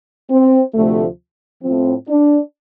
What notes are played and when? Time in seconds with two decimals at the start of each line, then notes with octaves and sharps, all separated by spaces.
0.30 C4
0.74 D2 C3 F3 A3
1.63 A2 F3 C4
2.08 D4